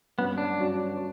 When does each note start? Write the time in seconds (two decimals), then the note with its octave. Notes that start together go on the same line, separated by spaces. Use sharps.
0.18 G2 F#3 B3 C#4 F#4 C#5
0.38 D4
0.58 G2 F#3 C#4 F#4 C#5
0.96 F#4 C#5